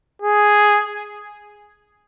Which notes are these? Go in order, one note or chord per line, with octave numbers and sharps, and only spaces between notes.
G#4